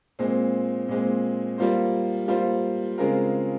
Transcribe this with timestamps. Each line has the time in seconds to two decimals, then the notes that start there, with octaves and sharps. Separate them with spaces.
0.19 A#2 G#3 C4
0.88 A#2 G#3 C4
1.58 G3 A#3 F4 C5
2.28 G3 A#3 F4 C5
2.98 C#3 G#3 C4 F4 A#4